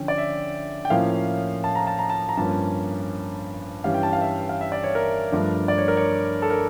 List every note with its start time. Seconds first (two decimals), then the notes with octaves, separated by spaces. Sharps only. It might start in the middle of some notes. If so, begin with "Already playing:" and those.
Already playing: D3 F3 C#4 G5
0.08 D5
0.18 E5
0.85 G5
0.90 A2 F3 A#3 C#4 F5
1.64 A5
1.75 A#5
1.87 A5
1.99 A#5
2.10 A5
2.29 A#5
2.37 G2 F3 A#3 C#4 A5
3.84 G2 E3 G3 C#4 F5
3.94 G5
4.03 A5
4.13 F5
4.21 E5
4.49 F5
4.61 E5
4.72 D5
4.84 C#5
4.95 A#4
5.32 G2 F3 A3 D4
5.68 D5
5.78 C#5
5.88 A#4
5.97 C#5
6.42 A4
6.50 A#4